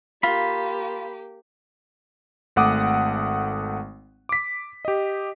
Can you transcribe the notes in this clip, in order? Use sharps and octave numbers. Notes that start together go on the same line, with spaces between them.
A#3 F4 G4 B5
G#1 A3 F#5 D6 D#6
D6 B6
G4 D#5